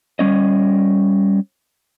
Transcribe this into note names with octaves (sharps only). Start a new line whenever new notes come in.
G3 C#4 D#5